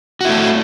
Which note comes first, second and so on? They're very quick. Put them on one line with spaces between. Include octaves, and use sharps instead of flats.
F#4 E4 A3